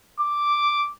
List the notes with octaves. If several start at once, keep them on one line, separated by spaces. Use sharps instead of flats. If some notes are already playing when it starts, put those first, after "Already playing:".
D6